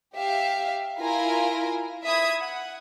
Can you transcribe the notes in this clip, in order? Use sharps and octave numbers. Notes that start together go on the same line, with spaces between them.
G4 E5 F5
E4 F4 A#4 G#5 A#5
E5 B5 D#6 G#6
F#5